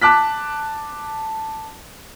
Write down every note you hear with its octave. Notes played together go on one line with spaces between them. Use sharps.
A5 D6 F#6 B6